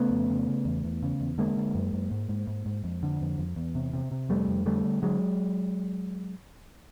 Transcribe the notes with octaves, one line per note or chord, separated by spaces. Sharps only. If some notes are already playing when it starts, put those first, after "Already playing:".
Already playing: C#3 A3 B3
F2
C#3
C#3
E2
E2
C#3
E2
D3 G#3 A#3
D3
F#2
F#2
G#2
G#2
G#2
G#2
F2
D3
F2
F2
E2
C3
C3
C3
F2 G3 A3
F2
D3 G3 A3
D3
D3 F#3 G#3